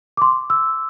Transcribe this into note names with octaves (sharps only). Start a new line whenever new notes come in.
D6
C6
E6